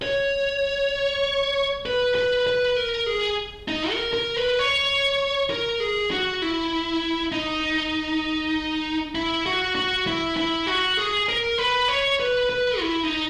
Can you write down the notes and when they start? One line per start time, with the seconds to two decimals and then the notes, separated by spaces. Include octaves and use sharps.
0.02 C#5
1.86 B4
2.15 B4
2.47 B4
2.76 A#4
3.06 G#4
3.68 D#4
3.91 A#4
4.14 A#4
4.37 B4
4.59 C#5
5.50 A#4
5.80 G#4
6.11 F#4
6.42 E4
7.32 D#4
9.15 E4
9.46 F#4
9.75 F#4
10.07 E4
10.37 E4
10.67 F#4
10.97 G#4
11.29 A#4
11.58 B4
11.88 C#5
12.20 B4
12.50 B4
12.79 E4
13.03 D#4